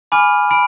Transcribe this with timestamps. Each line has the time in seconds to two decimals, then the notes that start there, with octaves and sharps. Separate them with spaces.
0.12 G#5 B5 D6 F6
0.51 B5 D7